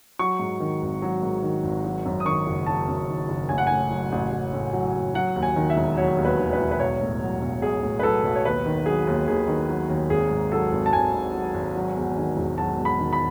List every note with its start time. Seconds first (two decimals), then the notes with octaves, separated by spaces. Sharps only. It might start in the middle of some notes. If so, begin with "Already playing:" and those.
0.19 F#3 C#6
0.39 G#2
0.60 D#3
0.82 G#1
1.02 F#3
1.23 G#2
1.43 D#3
1.63 G#1
1.85 F#3
2.05 F#2
2.20 D#6
2.26 D#3 C#6
2.46 F#1
2.66 F#3 A5
2.88 F#2
3.08 D#3
3.28 F#1
3.49 A1 G#5
3.58 F#5
3.67 A2 G#5
3.90 F#3
4.12 A1
4.32 A1
4.53 A2
4.73 F#3
4.93 A1
5.14 F#3 F#5
5.36 D#2
5.43 G#5
5.56 D#3
5.70 E5
5.77 E1
5.97 F#3 C#5
6.18 D#2
6.25 B4
6.39 D#3
6.53 B4
6.59 E1
6.71 B4
6.79 B1 C#5
7.01 A2
7.21 F#3
7.42 B1
7.62 B1 G#4
7.82 A2
7.99 B4
8.03 F#3 A4
8.24 B1
8.36 C#5
8.45 D#2 B4
8.66 D#3
8.86 F#3 G#4
9.07 D#2
9.28 D#2 G#4
9.48 D#3
9.68 F#3
9.90 D#2
10.10 G#1 G#4
10.31 G#2
10.52 F#3 A4
10.72 G#1
10.86 A5
10.93 G#1 G#5
11.13 G#2
11.34 F#3
11.54 G#1
11.75 F#3
11.96 E2
12.17 D#3
12.37 E1
12.58 F#3 A5
12.78 E2
12.85 B5
12.99 D#3
13.13 B5